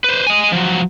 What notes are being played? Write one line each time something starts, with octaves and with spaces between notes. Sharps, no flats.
B4 C5
D#5 G#5
F3 F#3